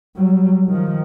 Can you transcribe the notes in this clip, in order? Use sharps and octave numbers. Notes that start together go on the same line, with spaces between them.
F#3 G3
D#3 F3